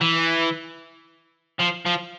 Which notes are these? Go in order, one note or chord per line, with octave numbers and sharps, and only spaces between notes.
E3
F3
F3